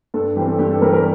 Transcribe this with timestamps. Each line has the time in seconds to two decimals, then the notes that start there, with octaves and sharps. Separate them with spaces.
0.14 G2 A4
0.36 E3 G3 C4 G4
0.48 A4
0.59 G2 G4
0.71 A4
0.82 E3 G3 C4 A#4
0.93 A#4